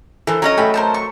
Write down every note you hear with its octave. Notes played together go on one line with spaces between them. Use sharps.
E3 A4 A#4 C5
F#3 C#4 D#5 A#5
A3 G#4 A4 E5 G5 B5
A#4 C5 A5
C#6